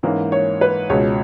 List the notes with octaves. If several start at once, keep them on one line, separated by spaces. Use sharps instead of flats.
G#2 E3 A#3 C#4
C#5
B4
C#2 B2 G#3 C#4 C#5